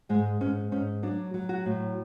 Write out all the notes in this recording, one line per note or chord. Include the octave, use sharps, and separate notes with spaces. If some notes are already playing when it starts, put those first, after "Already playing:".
G#2 G#3
G#2 C#4
G#2 C#4
F#3 D4
F#3
F#4
A2